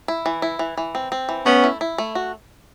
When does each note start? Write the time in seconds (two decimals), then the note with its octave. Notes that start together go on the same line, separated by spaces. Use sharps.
0.08 E4
0.26 E3
0.42 E4
0.59 E3
0.77 E3
0.95 C4
1.12 C4
1.29 E3
1.46 A3 B3 C#4
1.64 E4
1.81 E4
1.98 A3
2.15 F#4